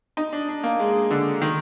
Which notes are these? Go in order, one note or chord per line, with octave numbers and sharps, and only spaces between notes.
D#4
D4
D4
A#3
G#3
D3
D#3